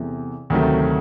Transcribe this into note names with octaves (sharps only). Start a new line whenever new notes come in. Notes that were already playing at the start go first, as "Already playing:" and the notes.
Already playing: E2 C3 E3 A3
D2 C3 D#3 F#3 A3